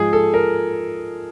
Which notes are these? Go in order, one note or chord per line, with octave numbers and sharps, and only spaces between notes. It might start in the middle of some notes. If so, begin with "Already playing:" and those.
Already playing: G#2 F3 G#4
A4
A#4